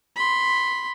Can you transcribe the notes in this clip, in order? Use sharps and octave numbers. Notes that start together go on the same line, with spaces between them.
B5 C6